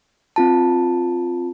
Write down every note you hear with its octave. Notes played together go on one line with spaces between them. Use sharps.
C4 F4 A5